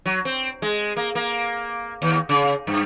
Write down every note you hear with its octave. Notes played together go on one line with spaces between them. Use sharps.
F#3
C4
G#3
A#3
A#3
D#2
C#3
G2